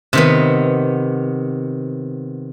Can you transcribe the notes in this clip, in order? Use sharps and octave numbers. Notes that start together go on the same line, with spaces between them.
C3 D#3 B3